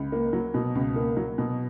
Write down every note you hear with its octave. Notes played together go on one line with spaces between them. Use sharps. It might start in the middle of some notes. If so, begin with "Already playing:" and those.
Already playing: C#2
A#3
F#3
B2
C#2
A#3
F#3
B2